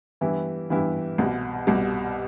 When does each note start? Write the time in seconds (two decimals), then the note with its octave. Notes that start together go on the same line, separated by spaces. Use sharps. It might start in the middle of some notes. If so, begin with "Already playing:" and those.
0.21 G2 E3 B3 E4 G4
0.70 G2 E3 B3 E4 G4
1.18 C2 B2 G3
1.67 C2 B2 G3